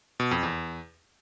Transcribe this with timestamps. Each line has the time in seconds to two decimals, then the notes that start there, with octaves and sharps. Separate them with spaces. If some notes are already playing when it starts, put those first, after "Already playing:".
0.20 B2
0.31 F2
0.43 E2